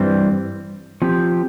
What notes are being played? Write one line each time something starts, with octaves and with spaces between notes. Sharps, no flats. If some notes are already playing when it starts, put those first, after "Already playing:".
Already playing: G2 E3 G3 C4
F3 C4 G4